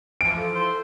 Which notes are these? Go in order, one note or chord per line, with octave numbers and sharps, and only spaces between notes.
E3 F3 D7
A4
C5